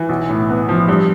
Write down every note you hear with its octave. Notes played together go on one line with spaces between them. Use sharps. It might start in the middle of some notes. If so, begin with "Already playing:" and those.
Already playing: E3
B1
A2
B3
F3
G2